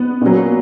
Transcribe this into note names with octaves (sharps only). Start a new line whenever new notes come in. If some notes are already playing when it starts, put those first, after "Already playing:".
Already playing: B3
A#2 F#3